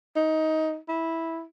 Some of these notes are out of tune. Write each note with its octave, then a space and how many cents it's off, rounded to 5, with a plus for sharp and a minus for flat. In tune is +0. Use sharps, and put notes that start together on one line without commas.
D#4 +15
E4 -10